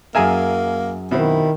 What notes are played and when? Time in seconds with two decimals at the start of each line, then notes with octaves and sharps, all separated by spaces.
0.15 F#2 A#3 G#4 A#4 E5 G#5 A#5
1.11 B2 D#3 C4 E4